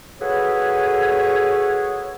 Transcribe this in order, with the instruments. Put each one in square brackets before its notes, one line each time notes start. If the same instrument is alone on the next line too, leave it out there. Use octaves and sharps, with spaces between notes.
[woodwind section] F#4 G#4 A4 B4 C#5